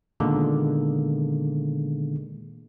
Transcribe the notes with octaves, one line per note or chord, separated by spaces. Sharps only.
A#2 D3 D#3 G#3 A#3 B3